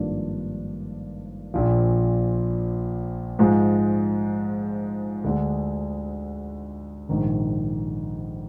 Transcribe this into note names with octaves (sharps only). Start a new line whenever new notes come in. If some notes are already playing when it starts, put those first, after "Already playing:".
Already playing: G#1 G2 F3 A#3 D4
A#1 A#2 F3
G#2 F3 G#3
D2 D3 G#3
A#1 G#2 D#3